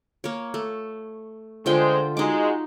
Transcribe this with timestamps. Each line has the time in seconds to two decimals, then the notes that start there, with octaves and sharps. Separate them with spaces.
0.24 A#3 C#5
0.54 A3
1.66 D3 G#3 F4 C5 G5
2.17 G#3 D#4 F#4 D6